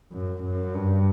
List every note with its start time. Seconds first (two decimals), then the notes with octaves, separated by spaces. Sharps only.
0.12 F#2
0.43 F#2
0.74 G2